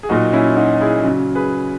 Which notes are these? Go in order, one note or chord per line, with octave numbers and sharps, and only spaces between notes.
G#4
A#2 F#3 D#4 F#4
C#4 E4
D#4 F#4
E4 G#4
C#3 F#3
G#4 B4